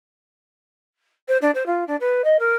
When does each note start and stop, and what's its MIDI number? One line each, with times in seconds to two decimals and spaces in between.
1.28 1.37 72
1.42 1.51 62
1.55 1.63 72
1.66 1.84 65
1.87 1.96 62
2.00 2.22 71
2.24 2.37 75
2.39 2.56 70